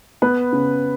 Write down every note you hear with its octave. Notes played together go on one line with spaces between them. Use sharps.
B3 B4
C#3